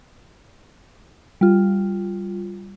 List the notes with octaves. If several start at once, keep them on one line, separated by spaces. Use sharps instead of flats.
G3 F4